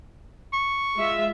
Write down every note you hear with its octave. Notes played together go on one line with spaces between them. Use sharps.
C#6
G#3 F4 E5